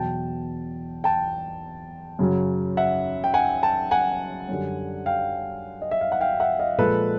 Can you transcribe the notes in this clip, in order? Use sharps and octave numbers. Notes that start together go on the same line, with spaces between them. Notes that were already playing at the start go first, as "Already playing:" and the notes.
Already playing: E2 B2 F#3 G5 A5
G5 A5
F#2 C#3 F#3
E5 F#5
G5
F#5 G#5
G5 A5
F#5 G#5
F#2 D3 G3
F5 G5
D#5
E5
F5
F#5
F5 G5
E5 F#5
D#5 F5
A#2 F3 G#3 A4 B4